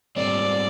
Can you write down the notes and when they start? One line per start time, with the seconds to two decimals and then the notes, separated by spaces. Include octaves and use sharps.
0.16 G#2 G3 C4 D5